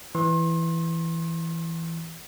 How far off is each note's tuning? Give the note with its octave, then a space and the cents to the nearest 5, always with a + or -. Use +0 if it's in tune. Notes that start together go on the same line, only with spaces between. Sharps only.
E3 +5 C6 +35